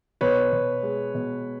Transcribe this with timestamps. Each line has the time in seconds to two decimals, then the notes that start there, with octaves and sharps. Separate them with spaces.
0.21 B2 B4 C#5
0.52 B2
0.83 G#3
1.14 B2